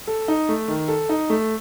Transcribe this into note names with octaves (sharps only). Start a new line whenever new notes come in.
A4
D#4
A3
D#3
A4
D#4
A3